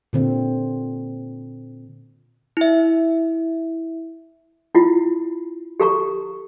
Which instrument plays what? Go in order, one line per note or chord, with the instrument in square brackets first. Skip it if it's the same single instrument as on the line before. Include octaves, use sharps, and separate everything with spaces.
[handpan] A#2 D3 C4
[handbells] E4 E5
[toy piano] E4 F4
G4 A4 A#5 C#6